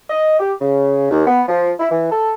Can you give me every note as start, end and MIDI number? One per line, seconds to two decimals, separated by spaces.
0.10 0.39 75
0.39 0.53 67
0.61 1.09 49
1.11 1.23 39
1.27 1.42 59
1.48 1.71 53
1.79 1.90 64
1.91 2.10 52
2.12 2.33 69